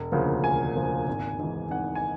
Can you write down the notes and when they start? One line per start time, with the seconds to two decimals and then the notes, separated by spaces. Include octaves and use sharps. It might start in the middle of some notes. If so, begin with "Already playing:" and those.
Already playing: E1
0.12 D2 C#3 F3 A#3
0.43 E1 G#5
0.75 D2 C#3 F3 A#3
1.07 G#1
1.39 G#2 E3
1.70 G#1 F#5
1.95 G#5